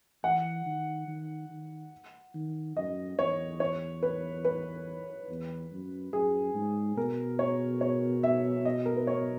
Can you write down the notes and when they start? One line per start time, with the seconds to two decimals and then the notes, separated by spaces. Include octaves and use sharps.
0.24 E3 F#5
0.66 D#3
1.08 D#3
1.50 D#3
2.35 D#3
2.76 F#2 D#5
3.18 E2 C#5
3.60 C#5
4.03 B4
4.45 B4
5.29 E2
5.71 F#2
6.13 F#2 G#4
6.55 G#2
6.97 B2 A#4
7.39 C#5
7.81 C#5
8.23 E5
8.65 D#5
8.86 A#4
8.96 B4
9.07 C#5